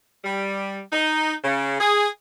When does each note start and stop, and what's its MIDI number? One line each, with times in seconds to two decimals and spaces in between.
0.24 0.80 55
0.93 1.33 63
1.44 1.76 49
1.80 2.07 68